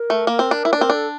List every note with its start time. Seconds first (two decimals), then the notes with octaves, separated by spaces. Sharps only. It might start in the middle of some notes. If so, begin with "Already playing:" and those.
Already playing: A#4
0.10 A3
0.27 A#3
0.39 C4
0.51 D4
0.65 E4
0.73 D4
0.77 C4 A#4
0.90 D4 A4